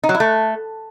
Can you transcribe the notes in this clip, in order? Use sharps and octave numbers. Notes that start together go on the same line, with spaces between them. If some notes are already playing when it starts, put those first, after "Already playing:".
D#4
F#3
E4
A3